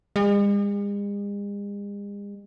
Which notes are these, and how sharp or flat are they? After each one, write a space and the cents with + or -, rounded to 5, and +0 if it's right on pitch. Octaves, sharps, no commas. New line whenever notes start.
G#3 -45